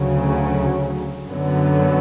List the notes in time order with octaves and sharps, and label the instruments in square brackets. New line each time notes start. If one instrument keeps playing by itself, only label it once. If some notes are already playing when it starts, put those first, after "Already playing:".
Already playing: [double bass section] D2 C#3 F#3
F#2 D3 F#3 B3